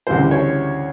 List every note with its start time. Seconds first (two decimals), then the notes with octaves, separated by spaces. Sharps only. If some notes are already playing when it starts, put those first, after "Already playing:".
0.07 D2 C#3 E3 G3 C5
0.31 C#5